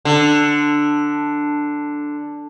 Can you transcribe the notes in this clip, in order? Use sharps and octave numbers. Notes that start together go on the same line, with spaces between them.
D3